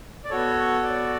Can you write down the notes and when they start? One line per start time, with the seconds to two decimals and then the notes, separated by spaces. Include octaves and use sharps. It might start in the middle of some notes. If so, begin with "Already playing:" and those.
0.24 D5
0.30 B3 F#4 A4 C#5
0.83 D5